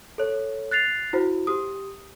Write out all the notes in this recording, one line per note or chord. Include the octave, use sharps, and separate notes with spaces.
A4 C#5
F#6 A6 C7 F7
E4 F#4 C5
G4 D#6